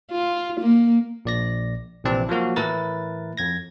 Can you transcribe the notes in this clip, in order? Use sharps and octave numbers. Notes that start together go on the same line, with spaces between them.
F4
A#3
A#1 D5 A#6
A#1 C3 E3 C4 D5 A5
F3 F#3 A#3 F#4
A2 E3 E4 A#4 B4 A6
F2 G#6 A#6